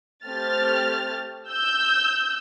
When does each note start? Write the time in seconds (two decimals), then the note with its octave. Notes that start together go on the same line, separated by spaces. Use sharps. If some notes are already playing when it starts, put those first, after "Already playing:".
0.25 A3 C4 G4 F6 A6
1.50 E6 G6